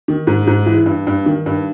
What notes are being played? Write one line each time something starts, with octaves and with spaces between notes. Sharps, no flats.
D#3
G#2
G#2
E3
G2
G2
D#3
G2